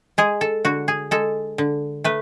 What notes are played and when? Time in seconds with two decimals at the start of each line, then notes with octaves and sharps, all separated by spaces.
0.18 G#3 G#4
0.41 A4
0.65 D3 F#4
0.88 G#4
1.11 G#3 A4
1.58 D3
2.04 A3 B4